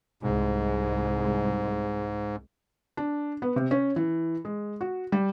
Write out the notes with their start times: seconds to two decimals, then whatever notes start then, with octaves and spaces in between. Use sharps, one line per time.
0.23 C2 G#2 G#3
2.97 D4
3.42 B3
3.56 C3
3.71 C#4
3.96 E3
4.45 G#3
4.81 F#4
5.12 G3